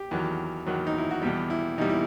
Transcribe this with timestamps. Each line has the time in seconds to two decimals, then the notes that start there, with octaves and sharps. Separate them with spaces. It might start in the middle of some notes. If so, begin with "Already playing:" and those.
Already playing: G4
0.11 E2 D#3 F#3
0.66 E2 D#3 F#3
0.87 D#4
0.98 E4
1.11 F#4
1.22 E2 B2 G3 G4
1.50 E4
1.78 E2 B2 G3 D#4
1.90 E4